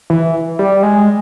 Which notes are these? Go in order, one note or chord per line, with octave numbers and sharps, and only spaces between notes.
E3
G3
G#3